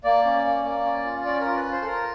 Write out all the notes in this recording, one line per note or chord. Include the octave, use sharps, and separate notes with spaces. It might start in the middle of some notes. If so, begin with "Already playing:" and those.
A#3 D5
C#4
A#3
A#3
C#4
F4
C#4 D5
A#4
F4
B4
F4
C5
A4
F4 A#4